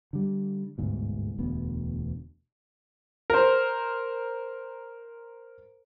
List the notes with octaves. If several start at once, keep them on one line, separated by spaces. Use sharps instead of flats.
D3 G3
G1 D2 G#2 B2
E1 D2 B3
A#4 C5